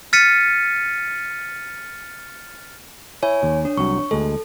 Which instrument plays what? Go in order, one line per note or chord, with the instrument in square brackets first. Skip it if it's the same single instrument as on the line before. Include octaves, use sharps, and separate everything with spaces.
[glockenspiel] F6 A6 B6 C#7 D#7
[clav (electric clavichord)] E4 [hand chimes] C#5 G#5
[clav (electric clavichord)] D#2
[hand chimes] D4 C#5
[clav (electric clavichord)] C2 F#3 [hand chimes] C#6
[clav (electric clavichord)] D2 G#3 [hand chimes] A4